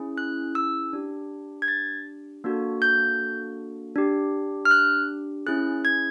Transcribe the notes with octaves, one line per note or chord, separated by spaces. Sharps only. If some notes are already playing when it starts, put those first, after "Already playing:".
Already playing: C#4 E4 G#4
F#6
E6
D4 G4
G#6
A6
A#3 D4 F#4 A4
G6
D4 G4
F6
F#6
C#4 E4 G#4 F#6
G#6